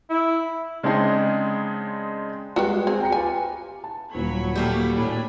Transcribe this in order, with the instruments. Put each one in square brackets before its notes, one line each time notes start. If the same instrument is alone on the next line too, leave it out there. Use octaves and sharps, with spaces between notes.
[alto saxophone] E4
[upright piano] C#3 G#3 C4 D4 D#4 G#4
[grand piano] G3 G#3 [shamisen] F#4 G4 B4
[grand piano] C4 [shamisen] G#4
[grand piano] G5 A#5 C#7
[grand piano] F4 G4 B4 [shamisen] G#5
[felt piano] A5
[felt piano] D#1 A#2 F4 [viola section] F#3 C#5 B5
[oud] G3 A3 A#3
[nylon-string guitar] A2 [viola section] D4 G#5 B5